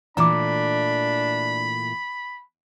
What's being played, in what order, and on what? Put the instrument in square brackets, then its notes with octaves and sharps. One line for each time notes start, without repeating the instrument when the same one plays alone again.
[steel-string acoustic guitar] A#2 E3 A3 [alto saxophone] D4 [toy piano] A#5 D6 [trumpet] B5